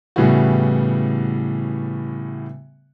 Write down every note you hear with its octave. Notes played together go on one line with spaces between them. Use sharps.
A2 C#3 E3 G3 B3 F#4